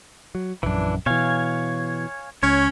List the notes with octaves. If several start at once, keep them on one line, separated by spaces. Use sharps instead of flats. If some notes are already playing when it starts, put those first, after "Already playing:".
F#3
A#1 F#2 E3 D4
B2 E3 C#5 F5 G#5
C#2 C#4 C#5